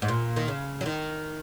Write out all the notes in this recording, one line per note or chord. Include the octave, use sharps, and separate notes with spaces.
G#2
A#2
D#3
C#3
F#3
D#3